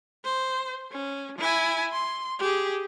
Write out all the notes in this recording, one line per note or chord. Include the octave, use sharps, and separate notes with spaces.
C5
C#4
E4 G#5
C6
G4 G#4